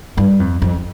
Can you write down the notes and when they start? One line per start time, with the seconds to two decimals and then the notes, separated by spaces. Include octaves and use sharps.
0.17 G2
0.40 F2
0.62 F2